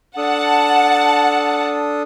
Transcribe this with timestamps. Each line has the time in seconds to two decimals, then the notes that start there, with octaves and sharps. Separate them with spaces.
0.17 D4 A4 F#5 A5 D#6